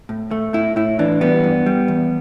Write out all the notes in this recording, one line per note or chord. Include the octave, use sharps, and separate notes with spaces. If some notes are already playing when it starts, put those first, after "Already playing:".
A2
A3
A2 E4
A2 E4
E3 D4
G3 B3
G2
G3
E2